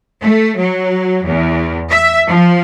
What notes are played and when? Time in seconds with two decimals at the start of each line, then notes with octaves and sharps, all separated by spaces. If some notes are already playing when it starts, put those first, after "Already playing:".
0.22 A3
0.58 F#3
1.25 E2
1.90 E5
2.30 F3